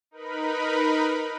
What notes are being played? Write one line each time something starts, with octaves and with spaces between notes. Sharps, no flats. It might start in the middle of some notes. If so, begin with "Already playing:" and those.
D#4 A#4 B4 B5